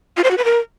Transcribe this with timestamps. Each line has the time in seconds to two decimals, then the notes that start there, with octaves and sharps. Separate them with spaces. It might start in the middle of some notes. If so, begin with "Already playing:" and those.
0.17 F4
0.24 C5
0.31 F#4
0.38 B4
0.45 A#4